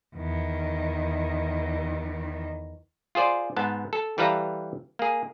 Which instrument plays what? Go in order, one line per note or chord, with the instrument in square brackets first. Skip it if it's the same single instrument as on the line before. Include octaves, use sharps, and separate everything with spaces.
[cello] E2 D#3
[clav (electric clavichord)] F4 G#4 C5 D5
G#2 B3 A5
A4
E3 G3 A4 B4 F5 A#5
A#3 G#4